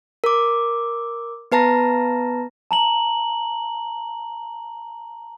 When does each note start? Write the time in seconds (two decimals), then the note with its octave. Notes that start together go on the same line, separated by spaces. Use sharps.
0.24 A#4 D6
1.52 B3 B4 A5 A#5 A#6
2.71 A5 A#5 F#7